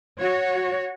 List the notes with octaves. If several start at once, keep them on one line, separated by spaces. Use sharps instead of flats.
F#4 C#5